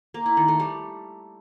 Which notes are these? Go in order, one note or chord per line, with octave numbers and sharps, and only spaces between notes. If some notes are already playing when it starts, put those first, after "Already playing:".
A#3
E4
D#3
A3
G3